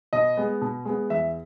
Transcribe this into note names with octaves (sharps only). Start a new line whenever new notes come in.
B2 D#5
G#3 B3
B2
G#3 B3
E2 E5